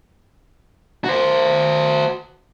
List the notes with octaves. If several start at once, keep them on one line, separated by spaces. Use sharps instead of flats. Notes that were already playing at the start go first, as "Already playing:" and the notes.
F#4 C5